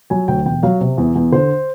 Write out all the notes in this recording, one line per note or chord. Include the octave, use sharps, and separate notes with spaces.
F#3 G#5
D2 G5
E1 G5
F#3 F5
C3
E2
E2
D3 C5